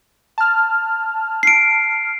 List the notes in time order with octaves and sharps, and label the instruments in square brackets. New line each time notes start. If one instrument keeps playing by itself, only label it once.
[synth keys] A5 F6
[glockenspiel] C7 D7